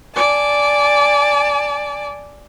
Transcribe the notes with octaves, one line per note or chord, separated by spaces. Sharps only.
D5 G#5 A5